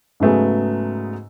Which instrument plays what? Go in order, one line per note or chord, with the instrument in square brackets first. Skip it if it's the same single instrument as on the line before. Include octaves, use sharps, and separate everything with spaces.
[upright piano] G#2 C#3 F#3 A3 B3 G#4